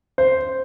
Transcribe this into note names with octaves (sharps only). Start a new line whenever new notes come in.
C5